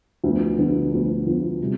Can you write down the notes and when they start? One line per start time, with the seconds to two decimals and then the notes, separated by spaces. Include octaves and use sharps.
0.24 D2 D3 F3 B3
0.58 D2 D3 F3 B3
0.92 D2 D3 F3 B3
1.26 D2 D3 F3 B3
1.60 C3 G3